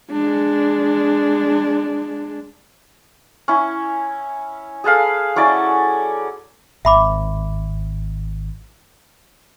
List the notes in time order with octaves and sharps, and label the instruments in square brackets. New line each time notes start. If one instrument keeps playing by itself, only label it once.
[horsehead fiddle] G#3 D4
[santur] C#4 E4
G#4 A4 B4 F5
F#3 C#4 E4 D5
[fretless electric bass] G#1 [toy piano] E5 B5 D6